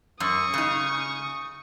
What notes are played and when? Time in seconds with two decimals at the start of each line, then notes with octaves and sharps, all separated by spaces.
0.20 F#2 C#6 D#6
0.54 C#3 D#4